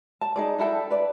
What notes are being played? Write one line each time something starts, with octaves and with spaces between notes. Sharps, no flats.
A5
D#4 G#4 D5
D4 E4 A4 G5
B4 D5